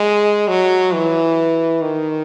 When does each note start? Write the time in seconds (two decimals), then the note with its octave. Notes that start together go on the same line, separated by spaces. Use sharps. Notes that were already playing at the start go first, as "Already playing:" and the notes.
Already playing: G#3
0.48 F#3
0.93 E3
1.82 D#3